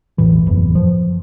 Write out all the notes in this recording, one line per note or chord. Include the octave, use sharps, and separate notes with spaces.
E1 A1 E3
F#1 E2 E3
F3